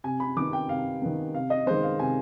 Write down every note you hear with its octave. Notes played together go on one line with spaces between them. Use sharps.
C3 G#5
B5
D#3 B3 D6
G5
C3 F5
D#3 B3
C3 F5
D#5
D#3 G#3 B3 C5
F5
C3 G#5